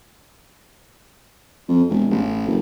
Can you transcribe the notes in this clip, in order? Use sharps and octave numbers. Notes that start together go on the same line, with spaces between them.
F2
E1
A1
F#1